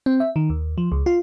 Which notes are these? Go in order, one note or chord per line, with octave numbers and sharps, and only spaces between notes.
C4
E5
D#3
D#2
F3
C#2
F4